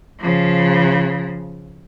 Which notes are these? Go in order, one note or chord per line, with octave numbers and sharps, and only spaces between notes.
C#3 F3